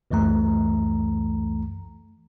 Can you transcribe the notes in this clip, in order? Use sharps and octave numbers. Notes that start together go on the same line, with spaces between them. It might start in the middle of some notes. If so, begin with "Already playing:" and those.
C#2 F#2 E3 A3 A#5